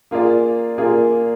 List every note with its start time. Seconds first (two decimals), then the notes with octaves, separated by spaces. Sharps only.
0.11 A#3 F4 G#4 D5
0.78 A#3 F4 G#4 D5